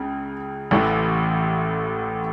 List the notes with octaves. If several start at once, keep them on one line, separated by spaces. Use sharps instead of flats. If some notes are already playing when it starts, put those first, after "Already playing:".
Already playing: C#2 C#3
A1 A2 E3